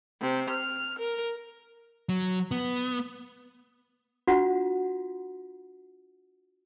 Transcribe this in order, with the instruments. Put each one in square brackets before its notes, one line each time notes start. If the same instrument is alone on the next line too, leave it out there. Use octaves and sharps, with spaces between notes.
[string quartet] C3
F6
A#4
[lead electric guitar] F#3
B3
[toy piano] D4 F4 F#4 F#5